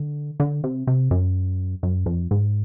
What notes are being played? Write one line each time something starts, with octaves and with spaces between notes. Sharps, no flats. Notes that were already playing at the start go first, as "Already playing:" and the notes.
Already playing: D3
D3
C3
C3
F#2
F#2
F2
G#2